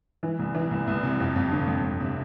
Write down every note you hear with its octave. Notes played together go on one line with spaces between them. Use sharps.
E3
C2
E3
C2
C2
C3
F2
F2
G1
F2
F2
C3